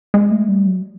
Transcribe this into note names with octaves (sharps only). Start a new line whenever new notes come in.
G#3
A3
G3
F#3